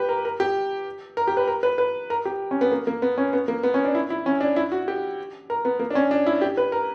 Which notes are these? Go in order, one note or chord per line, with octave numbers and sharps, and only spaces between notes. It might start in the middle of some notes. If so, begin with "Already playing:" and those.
Already playing: G4 B4
A#4
A#4
G4
A#4
G4
B4
A#4
B4
B4
A#4
G4
C#4
B3
A#3
A#3
B3
C#4
B3
A#3
B3
C#4
D4
E4
E4
C#4
D4
E4
F#4
G4
A#4
B3
A#3
D4
C#4
D4
E4
G4
B4
A#4